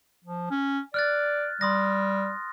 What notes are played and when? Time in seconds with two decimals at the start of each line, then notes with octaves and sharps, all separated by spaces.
0.24 F3
0.50 C#4
0.94 D5 F6 F#6 A6
1.61 G3 C6 D#6 A#6